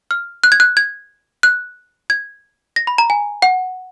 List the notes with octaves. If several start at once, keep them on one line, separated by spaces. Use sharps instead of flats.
F6
F#6
G#6
F#6
G#6
F#6
G#6
A#6
B5
A#5
G#5
F#5